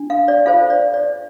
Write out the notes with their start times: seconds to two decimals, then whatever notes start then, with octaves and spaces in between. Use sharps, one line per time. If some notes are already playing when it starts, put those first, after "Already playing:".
Already playing: D4
0.10 F5
0.28 D5
0.46 F4 A4 C5 F5
0.70 D5
0.94 D5